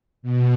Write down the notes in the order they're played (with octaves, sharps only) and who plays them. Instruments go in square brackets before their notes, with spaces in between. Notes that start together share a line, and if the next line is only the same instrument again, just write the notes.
[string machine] B2